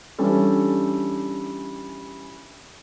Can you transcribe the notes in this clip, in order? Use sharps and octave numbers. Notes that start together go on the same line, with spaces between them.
E3 G3 C#4 D4 A4